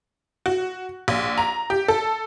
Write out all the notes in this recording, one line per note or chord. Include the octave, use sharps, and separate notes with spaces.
F#4
A#1
A#5
G4
A4